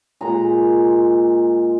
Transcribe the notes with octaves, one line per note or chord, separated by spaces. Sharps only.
A#2 G#3 A#5